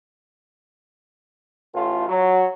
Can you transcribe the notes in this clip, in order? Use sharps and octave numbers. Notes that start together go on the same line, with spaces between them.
A1 A2 A3 F4
F#3